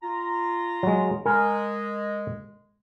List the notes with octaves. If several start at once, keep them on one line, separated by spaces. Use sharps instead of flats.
F4 A#5
F#3 G#3
G#3 A#4 G#5 A#5